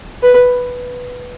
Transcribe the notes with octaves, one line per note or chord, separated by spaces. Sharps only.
B4